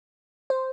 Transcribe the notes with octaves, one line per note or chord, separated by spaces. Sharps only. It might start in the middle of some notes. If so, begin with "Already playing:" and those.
C5